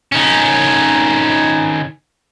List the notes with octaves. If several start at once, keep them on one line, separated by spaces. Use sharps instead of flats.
D#3 C#4